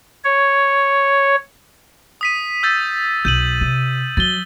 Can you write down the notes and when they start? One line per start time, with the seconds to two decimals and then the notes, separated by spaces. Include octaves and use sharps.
0.24 C#5
2.21 D#6 B6 D#7
2.63 E6 G6 A6
3.25 B1 G6 D#7 F#7
3.61 C3
4.17 F#3 A6 G7